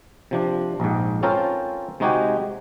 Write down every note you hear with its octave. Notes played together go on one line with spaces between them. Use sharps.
C3 F3 D4
A#1 G#2
C4 C#4 F4 A4 A#4 C5
C3 G#3 D#4 F#4 G4 G#5